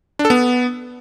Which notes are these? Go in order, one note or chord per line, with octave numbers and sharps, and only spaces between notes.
D4
A4
B3